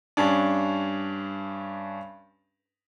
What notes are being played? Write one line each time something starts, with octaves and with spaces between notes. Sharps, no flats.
G2 C#4 D4